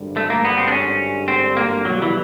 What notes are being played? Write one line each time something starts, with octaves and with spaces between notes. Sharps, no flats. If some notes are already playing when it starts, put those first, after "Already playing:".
Already playing: G#1 G2 D3 G3
A3
A#3
B3
C4
D4
C#4
C4
A#3
B1 B2 F#3 G3
E3